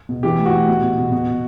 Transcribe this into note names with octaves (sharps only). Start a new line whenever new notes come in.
B2
E3 G4
A2
F#4
A2
B2
B2
B2
B2
B2